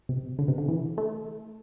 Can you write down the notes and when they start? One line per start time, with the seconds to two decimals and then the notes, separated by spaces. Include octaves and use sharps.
0.09 C3
0.39 D3
0.48 C3
0.58 D3
0.68 E3
0.98 A3